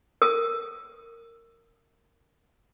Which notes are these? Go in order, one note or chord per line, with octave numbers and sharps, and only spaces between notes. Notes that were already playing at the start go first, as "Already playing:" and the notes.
A#4 D#6